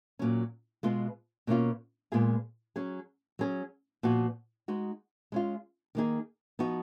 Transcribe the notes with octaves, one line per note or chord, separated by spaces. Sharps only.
A#2 F#3 C#4
B2 G#3 B3 F4
B2 A#3 C#4 F4
A#2 G#3 B3 F4 G#4
F#3 C#4 G#4
F#3 C#4 G#4
A#2 F3 B3 F#4
G#3 D#4 F#4
G#3 C#4 F4
D#3 A#3 D#4 G#4
F3 B3 D#4 F#4